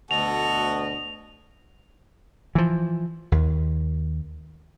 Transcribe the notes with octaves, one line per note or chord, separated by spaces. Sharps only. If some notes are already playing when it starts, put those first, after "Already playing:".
D2 B2 F#4 A4 D#5 F7
E3 F3
D#2